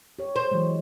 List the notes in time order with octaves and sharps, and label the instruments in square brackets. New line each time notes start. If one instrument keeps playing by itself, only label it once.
[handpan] G4 C#5
[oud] C5
[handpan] E3 F#3 G#3